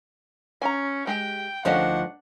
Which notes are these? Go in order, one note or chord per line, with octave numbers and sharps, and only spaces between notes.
C#4 G#5 A#5
G#3 G4 G5
D2 D#3 F3 C#4 D4 C5 D#5 F#5